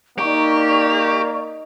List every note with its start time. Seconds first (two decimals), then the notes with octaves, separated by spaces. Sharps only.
0.18 A#3 D#4 G4 D5 C#6